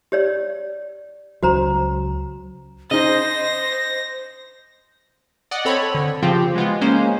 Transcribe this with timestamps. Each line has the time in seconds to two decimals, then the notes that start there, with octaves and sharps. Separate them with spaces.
0.12 G4 C#5 D5
1.43 C#2 F#3 F#4 C5 A#5
2.91 C#3 D#4 C5 D#5 A#6
5.51 D5 D#5 F#5
5.65 C4 A4 C#5 B5
5.95 D3
6.22 C#3 F3 C4 F4 G4
6.56 G#3 B3 F4
6.81 G#3 A#3 C#4 C5